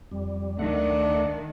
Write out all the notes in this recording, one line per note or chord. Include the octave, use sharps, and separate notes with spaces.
F2 G3
D2 D#3 A3 D4 F#5